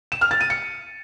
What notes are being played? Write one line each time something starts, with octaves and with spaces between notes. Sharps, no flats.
E7
F6
A6
D#7
C#7